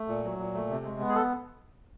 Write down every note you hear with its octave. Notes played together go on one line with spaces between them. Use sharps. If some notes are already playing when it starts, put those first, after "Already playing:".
Already playing: A3
A#2
F#3
A#2
A3
C3
G#3
B3
G#4
A4